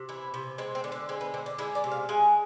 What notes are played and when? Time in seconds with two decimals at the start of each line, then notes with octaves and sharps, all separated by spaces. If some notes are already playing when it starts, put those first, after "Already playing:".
Already playing: C3
0.09 E3 E4
0.34 C3
0.58 G#3 C4
0.75 C4
0.84 D3
0.92 D4
1.09 G#3 C4
1.21 B3
1.34 D3 C4
1.46 D4
1.59 G#3 E4
1.75 D5
1.84 C3
1.92 F5
2.09 G#3 G#5